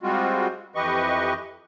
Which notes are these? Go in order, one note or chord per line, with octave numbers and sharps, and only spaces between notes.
G3 G#3 C4 F4 F#4
F2 E3 G4 B4 D#5 C#6